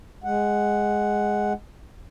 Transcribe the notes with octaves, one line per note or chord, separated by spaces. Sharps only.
G#3 F#5